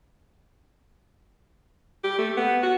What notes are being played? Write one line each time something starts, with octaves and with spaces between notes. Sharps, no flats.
G4
A3
B3
F#4